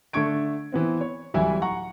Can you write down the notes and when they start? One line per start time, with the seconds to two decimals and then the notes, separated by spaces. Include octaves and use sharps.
0.13 D3 A3 D4 C#6 G#6 D7
0.72 E3 B3 C4
1.01 C#5
1.34 D1 E3 G3 E4 E5 G#5
1.62 F#5 A#5 C#6